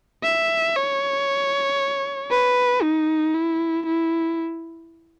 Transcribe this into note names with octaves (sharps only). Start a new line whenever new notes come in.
E5
C#5
B4
D#4
E4
E4